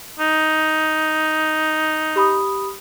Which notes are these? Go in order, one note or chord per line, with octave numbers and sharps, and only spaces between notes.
D#4
G4 B5 D#6